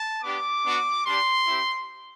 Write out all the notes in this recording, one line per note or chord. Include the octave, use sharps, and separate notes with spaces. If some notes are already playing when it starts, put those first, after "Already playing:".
Already playing: A5
B3 D4 G4 D6
B3 D4 F#4
G3 D4 G4 C6
C4 E4 G4